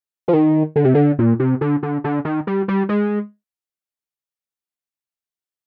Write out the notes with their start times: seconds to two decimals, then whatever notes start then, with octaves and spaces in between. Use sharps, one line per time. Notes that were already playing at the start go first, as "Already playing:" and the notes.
0.28 F3
0.33 D#3
0.76 D3
0.84 C3
0.95 D3
1.19 A#2
1.40 C3
1.61 D3
1.83 D3
2.04 D3
2.25 D#3
2.47 G3
2.68 G3
2.89 G#3